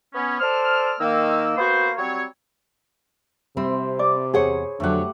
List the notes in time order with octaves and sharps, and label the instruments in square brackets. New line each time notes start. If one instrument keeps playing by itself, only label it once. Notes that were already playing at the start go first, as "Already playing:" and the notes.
[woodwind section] B3 C#4
A4 C5 D5 F6
D#3 A#3 E6
A#3 B3 F#4 C5
F#3 G3 C4 C#5
[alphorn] C3 [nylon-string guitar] G3 C4 [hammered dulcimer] E4 C5
[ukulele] D5 [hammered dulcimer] D6
[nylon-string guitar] E2 F#5 [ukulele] G#4 C5 C#5
[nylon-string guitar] F2 F#3 [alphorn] D3 [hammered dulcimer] A3 G4 F#5